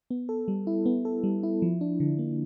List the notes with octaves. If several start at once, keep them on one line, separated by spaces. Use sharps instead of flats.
B3
A4
G3
E4
B3
A4
G3
E4
F3
D4
D3
A#3